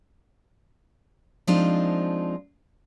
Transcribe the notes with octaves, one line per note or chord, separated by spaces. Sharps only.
F3 G#3 C4 D4 D#4 F4